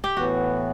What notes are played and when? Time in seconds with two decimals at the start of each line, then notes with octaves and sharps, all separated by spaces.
0.04 G4
0.17 A2 E3 B3 F#4